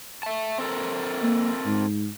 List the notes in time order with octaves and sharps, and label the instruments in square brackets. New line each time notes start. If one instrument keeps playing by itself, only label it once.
[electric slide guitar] E5 A5
C4 A4 A#4
[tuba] A#3
G#2